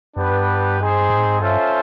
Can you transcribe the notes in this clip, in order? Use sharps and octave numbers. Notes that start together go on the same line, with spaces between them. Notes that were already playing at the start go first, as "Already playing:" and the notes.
F#2 B3 D4 G4 B4
G2
C4 D#4 G#4 C5
G#2
A2
G#2
G2 C#4 F4 A4 C5 E5